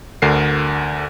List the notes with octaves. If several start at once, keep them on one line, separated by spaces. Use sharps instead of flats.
D2 D3 A#4 C7